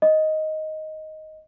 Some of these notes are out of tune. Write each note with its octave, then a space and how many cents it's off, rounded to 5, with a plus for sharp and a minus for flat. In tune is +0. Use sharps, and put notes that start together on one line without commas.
D#5 +5